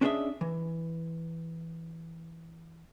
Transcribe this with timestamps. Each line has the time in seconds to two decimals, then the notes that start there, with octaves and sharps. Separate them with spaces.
0.01 C#4 D4 G#4 C#5 D#5 E5
0.41 E3